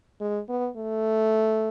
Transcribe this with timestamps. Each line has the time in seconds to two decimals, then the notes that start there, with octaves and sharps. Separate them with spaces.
0.21 G#3
0.49 B3
0.76 A3